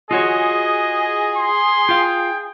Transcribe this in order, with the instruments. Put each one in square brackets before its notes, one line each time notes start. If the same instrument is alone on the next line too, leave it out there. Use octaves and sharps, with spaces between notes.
[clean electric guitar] F4 F#4 C#5 [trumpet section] G#4 [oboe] D#5
[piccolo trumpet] C6
[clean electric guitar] F4 F5 [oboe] G5